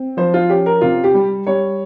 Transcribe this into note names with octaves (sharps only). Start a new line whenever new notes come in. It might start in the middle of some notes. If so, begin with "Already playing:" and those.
Already playing: C4
F3 C5
F4
C#4 G4
A#4
C3 F4
G4
G3
G3 C#5